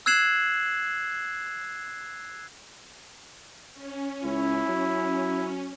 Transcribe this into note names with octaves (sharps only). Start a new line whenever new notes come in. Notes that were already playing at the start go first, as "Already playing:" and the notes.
E6 F#6 G#6 C7 E7 F#7
C#4
C#2 E4
F#3